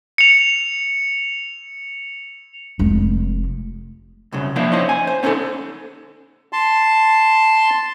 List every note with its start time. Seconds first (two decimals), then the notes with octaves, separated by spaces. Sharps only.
0.18 C#7 F7
2.79 F1 G#3
4.32 C2 F#2 C#3
4.56 F3 A#3 B3 D4 E4
4.72 C#4 D#4 C5
4.89 G#5
5.07 C5
5.23 B3 C#4 D#4 G#4 A4
6.53 A5 C6